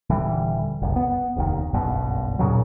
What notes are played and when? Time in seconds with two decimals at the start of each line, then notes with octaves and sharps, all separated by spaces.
0.10 D#1 D3 E3 G3
0.82 F#1 C2
0.96 B3
1.36 F1 D#2 D#3
1.73 F#1 B1 G2 B2
2.39 D#2 A#2 C#3 F#3